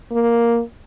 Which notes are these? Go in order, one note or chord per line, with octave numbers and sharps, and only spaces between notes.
A#3